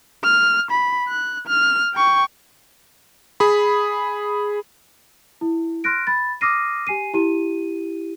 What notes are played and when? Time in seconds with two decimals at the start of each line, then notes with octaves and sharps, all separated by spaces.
0.24 F6
0.71 B5
1.08 F#6
1.47 F6
1.95 G5 C#6
3.40 G#4 B5
5.41 E4
5.84 C6 F6 F#6 A#6 D7
6.07 B5 A6
6.41 D6 D#6 F6 A#6 C7 D#7
6.87 G4 G#5 C7 D#7
7.14 E4 G4 D#7